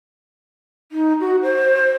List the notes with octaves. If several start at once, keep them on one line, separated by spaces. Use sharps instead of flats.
D#4
F#4
C5